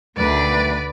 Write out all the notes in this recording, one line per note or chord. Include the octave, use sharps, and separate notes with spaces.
D2 B2 D#3 A3 B4 D5